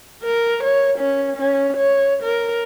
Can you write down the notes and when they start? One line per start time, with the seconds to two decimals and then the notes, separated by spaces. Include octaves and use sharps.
0.23 A#4
0.64 C#5
0.98 C#4
1.37 C#4
1.77 C#5
2.23 A#4